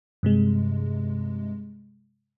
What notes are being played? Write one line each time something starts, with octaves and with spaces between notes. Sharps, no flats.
G2 C3 G#3